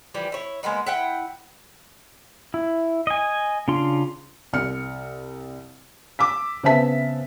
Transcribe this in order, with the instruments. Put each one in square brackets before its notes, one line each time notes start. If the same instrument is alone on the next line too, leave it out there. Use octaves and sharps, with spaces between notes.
[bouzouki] E3 F3 G3
E4 C#5
G#3 A#3 B3 D#4
E4 F#5 G5
[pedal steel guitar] E4
D#5 G#5
C#3 D4 F4 C6
[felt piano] C2 F6 C#7
D6 E6 B6
C#3 B3 C4 E5 A5 B6